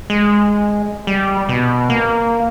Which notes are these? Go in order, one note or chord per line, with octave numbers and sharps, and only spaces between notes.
G#3
G3
B2
A#3